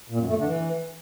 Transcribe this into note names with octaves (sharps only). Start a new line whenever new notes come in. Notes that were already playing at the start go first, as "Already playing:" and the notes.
A#2
F#2
A3
D3
E3